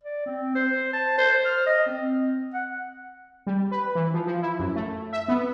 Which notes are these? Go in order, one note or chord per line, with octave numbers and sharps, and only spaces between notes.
D5
C4
C5
A5
C5
F6
D#5
C4
F#5
G3
B4
E3
F3
F3
E4
F#2
A3
E5
B3